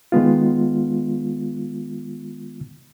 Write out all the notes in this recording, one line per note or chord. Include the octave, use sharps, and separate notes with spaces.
D#3 G#3 B3 F4